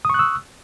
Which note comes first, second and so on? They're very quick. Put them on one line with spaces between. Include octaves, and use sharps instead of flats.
D#6 C#6 F#6 E6